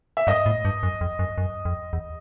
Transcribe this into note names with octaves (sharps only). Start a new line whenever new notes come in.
E5
G2 D#5
A2
G2
F#2
F2
F#2
F#2
F2
E2